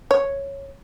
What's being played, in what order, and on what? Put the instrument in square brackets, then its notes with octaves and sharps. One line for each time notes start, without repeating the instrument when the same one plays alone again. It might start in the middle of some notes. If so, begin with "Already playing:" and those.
[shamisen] C#5